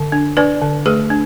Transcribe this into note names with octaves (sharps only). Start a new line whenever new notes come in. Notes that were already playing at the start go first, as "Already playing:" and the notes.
Already playing: D3
D4
D4 B4 D5
D3
A3 G#4 B4
D4